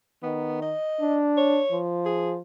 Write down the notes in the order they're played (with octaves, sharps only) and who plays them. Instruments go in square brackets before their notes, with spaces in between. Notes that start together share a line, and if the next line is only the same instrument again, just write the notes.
[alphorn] D#3 [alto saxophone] B3
[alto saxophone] D#5
[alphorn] D4
[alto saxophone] C#5
[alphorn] F3
[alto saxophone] G#4